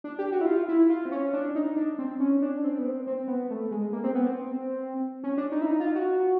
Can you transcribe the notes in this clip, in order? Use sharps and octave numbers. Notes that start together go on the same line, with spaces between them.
D4
G4
F#4
E4
F4
E4
F4
C4
C#4
D4
D#4
D4
C4
C#4
D4
C4
B3
C4
C4
B3
A3
G#3
A#3
C4
B3
C4
C#4
D4
D#4
E4
D#4
F4
F#4